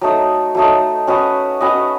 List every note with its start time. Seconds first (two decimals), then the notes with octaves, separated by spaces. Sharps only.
0.01 F#3 A3 D#4
0.55 F#3 A3 D#4
1.07 C#4 F#4 B4 D#5
1.61 C#4 F#4 B4 D#5